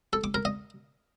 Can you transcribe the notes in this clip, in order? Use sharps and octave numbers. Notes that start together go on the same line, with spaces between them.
A4
D6
A#4
D#5